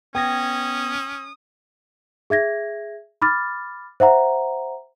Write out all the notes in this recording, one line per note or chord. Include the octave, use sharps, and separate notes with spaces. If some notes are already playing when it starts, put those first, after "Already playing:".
B3 C#4 G5 D#6 G#6 A#6
G#4 E5 G#6 A#6
B5 D6 F6 A6
C5 E5 F#5 A#5